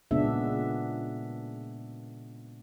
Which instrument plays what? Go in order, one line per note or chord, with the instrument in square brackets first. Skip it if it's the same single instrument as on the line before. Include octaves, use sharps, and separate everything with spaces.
[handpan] A#2 C#3 G#3 B3 D4 E5